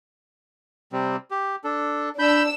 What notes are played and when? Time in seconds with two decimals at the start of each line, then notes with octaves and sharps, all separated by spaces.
0.93 C3 G3 C4
1.31 G4
1.64 D4 A4
2.19 D4 B5 E6 G6